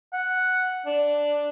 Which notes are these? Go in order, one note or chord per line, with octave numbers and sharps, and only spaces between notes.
F#5
D4